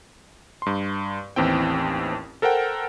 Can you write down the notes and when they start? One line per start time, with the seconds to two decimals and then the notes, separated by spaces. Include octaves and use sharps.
0.62 G2 C6
1.36 A1 D#2 E3 C4 G5
2.42 A4 A#4 C5 F#5 G5